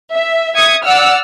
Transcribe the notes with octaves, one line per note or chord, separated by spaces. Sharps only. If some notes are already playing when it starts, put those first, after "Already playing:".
E5
E5 D#6 G#6 C#7
D5 F#5 E6 F6